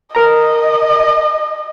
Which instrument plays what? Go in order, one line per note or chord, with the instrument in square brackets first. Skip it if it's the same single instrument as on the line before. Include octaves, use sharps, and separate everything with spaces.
[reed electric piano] A#4 A#5 [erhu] D#5